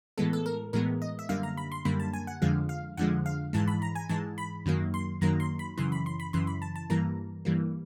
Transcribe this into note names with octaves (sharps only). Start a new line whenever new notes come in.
A2 E3 G#3 B3 A4
A4
A#4
A2 E3 G#3 B3 A#4
D#5
E5
F#2 D3 G3 A#3 F5
A#5
B5
C6
F#2 D3 G3 A#3 B5
A5
G#5
F#5
F2 D3 F3 G#3 F5
F5
F2 D3 F3 G#3 F#5
F5
G#2 E3 G#3 A5
B5
A#5
G#5
G#2 E3 G#3 A5
B5
F#2 D#3 F#3 A#3
C6
F#2 D#3 F#3 A#3 A#5
C6
B5
F#2 C#3 E3 C6
B5
C6
B5
F#2 C#3 E3 C6
B5
A5
A5
G2 E3 G3 A#3 A#5
G2 E3 G3 A#3